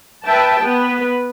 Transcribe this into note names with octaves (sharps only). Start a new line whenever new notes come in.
B4 E5 G5 A5
B3 B4